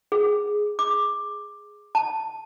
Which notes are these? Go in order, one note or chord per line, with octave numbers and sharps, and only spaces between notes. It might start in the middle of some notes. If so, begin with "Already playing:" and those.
G#4
D6
A5